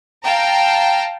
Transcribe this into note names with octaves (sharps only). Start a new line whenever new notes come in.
F5 G5 A5 A#5